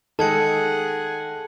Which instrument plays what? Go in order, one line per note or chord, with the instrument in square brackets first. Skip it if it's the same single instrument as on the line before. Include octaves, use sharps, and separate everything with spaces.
[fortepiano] D#3 G#3 [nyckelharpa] G#4 F#5 [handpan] A4 [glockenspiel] A5 G#6 C#7